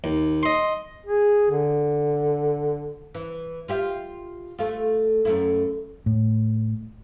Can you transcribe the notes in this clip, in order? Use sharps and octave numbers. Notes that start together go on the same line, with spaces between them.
D#2
D#5 C6
G#4
D3
E3
F4 G4 E5
A3 F4
F#2 A3 E4
A2